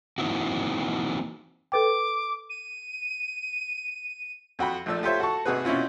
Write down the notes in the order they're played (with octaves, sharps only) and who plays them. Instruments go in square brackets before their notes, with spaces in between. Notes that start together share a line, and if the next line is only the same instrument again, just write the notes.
[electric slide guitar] E3 A#3 C4 D#4 E4 F#4
[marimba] A4 B4 G5 [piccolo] D6
[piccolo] D#7
[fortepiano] F2 F#4 G5 B5
A#1 F3 A3 D5 E6
F4 G4 A4 C5 C#5 E5
F#4 A4 A5 C#6
G#1 C3 F#4 G#4 B4
B2 C4 C#4 E4 F4